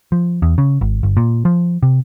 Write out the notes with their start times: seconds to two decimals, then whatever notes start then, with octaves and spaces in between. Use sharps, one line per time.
0.12 F3
0.42 E2
0.58 C#3
0.81 G#1
1.03 G1
1.17 A#2
1.45 F3
1.83 C3